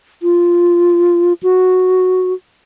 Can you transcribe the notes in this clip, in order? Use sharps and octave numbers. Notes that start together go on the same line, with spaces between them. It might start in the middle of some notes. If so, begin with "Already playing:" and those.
F4
F#4